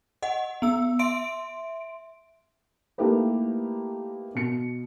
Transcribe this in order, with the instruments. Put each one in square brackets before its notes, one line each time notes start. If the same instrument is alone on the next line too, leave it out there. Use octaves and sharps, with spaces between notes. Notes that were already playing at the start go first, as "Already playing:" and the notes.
[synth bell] D#5 F#5
B3 E6
E5 C6 D7
[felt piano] A3 A#3 D#4 E4 G4 B4
B2 C#7